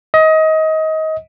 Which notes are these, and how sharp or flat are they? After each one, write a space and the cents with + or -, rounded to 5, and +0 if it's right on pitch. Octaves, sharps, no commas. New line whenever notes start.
D#5 +25